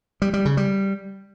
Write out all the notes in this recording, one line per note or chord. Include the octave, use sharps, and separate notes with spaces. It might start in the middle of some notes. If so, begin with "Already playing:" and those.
G3
G3
C#3
G3